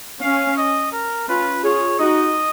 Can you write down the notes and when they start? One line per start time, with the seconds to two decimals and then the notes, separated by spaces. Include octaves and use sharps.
0.21 C#4 F5
0.57 D#5
0.92 A#4
1.28 C#4 F4 B4
1.64 F4 G#4 C#5
1.99 D#4 F#4 D#5